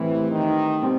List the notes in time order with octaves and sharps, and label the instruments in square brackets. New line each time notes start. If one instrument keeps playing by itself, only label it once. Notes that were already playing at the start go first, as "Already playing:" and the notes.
Already playing: [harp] A2 G3 C4 E4 [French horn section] E3
[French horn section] D#3
[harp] B2 G3 C4